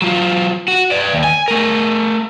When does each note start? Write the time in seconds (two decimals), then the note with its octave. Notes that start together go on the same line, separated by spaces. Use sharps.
0.02 F#3 F4
0.68 F#4
0.91 B4 D5
1.12 D#2
1.24 G#5
1.48 A3 A#4